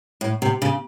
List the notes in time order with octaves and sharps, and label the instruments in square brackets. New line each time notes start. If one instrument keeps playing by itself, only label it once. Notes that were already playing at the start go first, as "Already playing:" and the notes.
[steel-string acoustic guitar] A2
C3
C#3